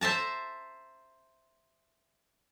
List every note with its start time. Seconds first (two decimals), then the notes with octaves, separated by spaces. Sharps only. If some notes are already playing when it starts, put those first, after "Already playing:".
0.01 C5 E5 A5 A#5